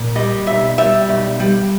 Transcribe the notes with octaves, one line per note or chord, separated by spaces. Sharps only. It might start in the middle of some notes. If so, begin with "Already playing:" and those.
Already playing: A#2
G3 D#5
B1 E5
G3 E5
B1
G3